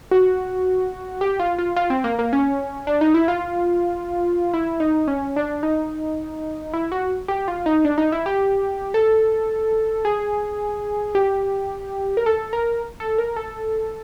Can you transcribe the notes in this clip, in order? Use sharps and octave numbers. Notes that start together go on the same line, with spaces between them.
F#4
G4
F4
F4
F4
C4
A#3
A#3
C#4
D4
D#4
E4
F4
E4
D#4
C#4
D4
D#4
E4
F#4
G4
F4
D#4
D4
D#4
E4
G4
A4
G#4
G4
A#4
A4
A#4
A4
A#4
A4